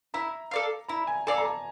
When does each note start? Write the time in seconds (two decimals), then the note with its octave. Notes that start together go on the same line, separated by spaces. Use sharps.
0.14 E4 A#5
0.51 A4 D5 F5
0.89 E4 A#5
1.07 G#5
1.27 A4 D5 F5 G#5
1.38 A#5
1.45 A5